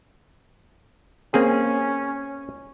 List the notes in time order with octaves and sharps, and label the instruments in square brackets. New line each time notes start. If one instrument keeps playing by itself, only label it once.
[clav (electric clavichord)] A#3 C4 G#4 [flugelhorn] C#4